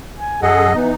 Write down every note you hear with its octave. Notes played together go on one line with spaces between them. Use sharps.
G#5
F#2 G#4 A4 D#5 F#5
E3 B3 D#4